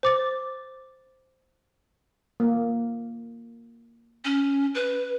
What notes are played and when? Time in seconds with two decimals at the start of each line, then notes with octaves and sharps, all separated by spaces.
0.03 C5 D6 A6
2.40 A#3
4.25 C#4
4.75 B4